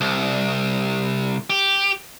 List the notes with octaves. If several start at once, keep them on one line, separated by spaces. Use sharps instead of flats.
C2
G4